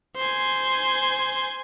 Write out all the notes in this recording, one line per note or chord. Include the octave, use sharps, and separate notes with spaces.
C5 G#5